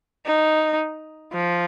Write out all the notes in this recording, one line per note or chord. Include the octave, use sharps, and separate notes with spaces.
D#4
F3